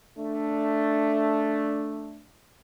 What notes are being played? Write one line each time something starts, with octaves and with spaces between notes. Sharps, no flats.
A3 D4